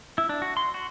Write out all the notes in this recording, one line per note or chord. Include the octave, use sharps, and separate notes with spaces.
E4
D4
F#4
C6
F#4